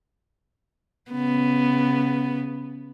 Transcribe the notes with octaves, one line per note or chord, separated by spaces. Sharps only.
C#3 B3